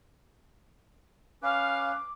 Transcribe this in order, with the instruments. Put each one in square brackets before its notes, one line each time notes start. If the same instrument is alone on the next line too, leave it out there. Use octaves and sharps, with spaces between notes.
[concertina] C#4 B4 [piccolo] F5 [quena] D6